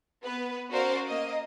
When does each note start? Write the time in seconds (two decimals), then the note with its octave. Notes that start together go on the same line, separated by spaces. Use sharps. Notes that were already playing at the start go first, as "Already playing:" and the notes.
0.23 B3 B4
0.71 C#4 F#4 A#4 C5 D5 F5
1.08 A#3 D#5